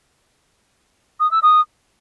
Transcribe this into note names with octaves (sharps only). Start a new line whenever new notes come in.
D#6
E6
D#6